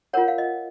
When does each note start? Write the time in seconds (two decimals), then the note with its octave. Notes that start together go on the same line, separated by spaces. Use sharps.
0.13 F4 A#4 C#5 F#5
0.28 F5
0.38 D#5